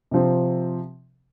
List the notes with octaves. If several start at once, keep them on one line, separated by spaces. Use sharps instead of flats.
C3 F3 C4